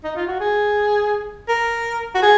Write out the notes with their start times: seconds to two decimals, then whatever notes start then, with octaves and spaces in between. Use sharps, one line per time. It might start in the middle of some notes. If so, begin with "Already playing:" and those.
0.04 D#4
0.16 F4
0.28 F#4
0.40 G#4
1.49 A#4
2.15 F#4
2.22 G#4